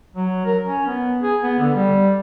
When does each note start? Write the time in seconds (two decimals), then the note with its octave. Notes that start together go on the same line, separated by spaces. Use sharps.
0.16 F#3
0.45 A#4
0.65 C#4
0.86 B3
1.22 G#4
1.42 B3
1.59 D3
1.74 G3